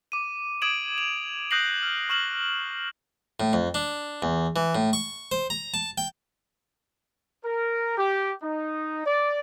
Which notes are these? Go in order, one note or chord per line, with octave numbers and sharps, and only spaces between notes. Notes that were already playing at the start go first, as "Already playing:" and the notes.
D6 D#7
D6 D#6 G#6 D7 E7 F#7
F7
D#6 F#6 G6 A#6 C7 F#7
F6
C#6 F6 E7 F#7
A2
F2
D4
E2
E3
A2
C#6
C5
A#5
A5
G5
A#4
G4
D#4
D5